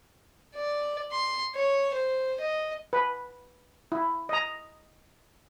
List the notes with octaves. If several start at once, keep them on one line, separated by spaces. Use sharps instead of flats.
D5
C6
C#5
C5
D#5
B4
E4
D#5 A#5